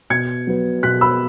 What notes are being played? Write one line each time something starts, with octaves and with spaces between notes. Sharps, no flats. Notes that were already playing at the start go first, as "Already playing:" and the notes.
B2 G#6 C#7
F#3 B3
B2 F#6 B6
B5 E6